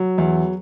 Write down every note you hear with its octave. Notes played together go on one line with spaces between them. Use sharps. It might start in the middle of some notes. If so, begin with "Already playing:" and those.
Already playing: F#3
E2